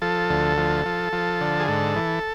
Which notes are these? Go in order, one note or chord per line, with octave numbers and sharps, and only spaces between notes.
F3 A4
D2
F3
F3
F3
D3
G#4
G#2 A4
E3